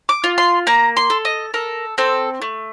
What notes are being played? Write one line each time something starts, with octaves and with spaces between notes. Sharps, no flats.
D6
F4
C6
A#3 A#5
C6
A4
D#5
A4 A#4
C4 A4
A3